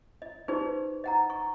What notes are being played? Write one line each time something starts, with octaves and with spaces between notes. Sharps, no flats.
D#5
D#4 G4 G#4 B4 C5 D5
D#5 F#5 A#5
C#6